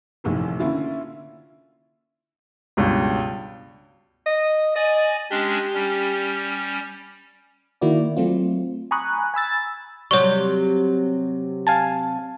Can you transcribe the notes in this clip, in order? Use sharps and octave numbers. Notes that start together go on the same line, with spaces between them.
A#1 A2 C3 D#3 E3
D3 A#3 C#4 E4 F4
C#2 G2 B2
D#5
D5 D#5 G#5
G#3 C#4 D4 G4
G3 C#4
D#3 A#3 E4 F#4 D5
F#3 A3 C4 F4
G#5 A#5 B5 C#6 D#6 F#6
G#5 B5 E6 A6
C3 F#3 G3 C#5 C#6
F5 G#5 A5